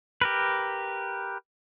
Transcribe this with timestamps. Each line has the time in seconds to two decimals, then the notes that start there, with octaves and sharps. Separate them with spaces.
0.21 G4 A#4 B4